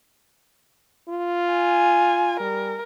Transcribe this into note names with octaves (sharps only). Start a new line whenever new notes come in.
F4
G#5
G3 A#4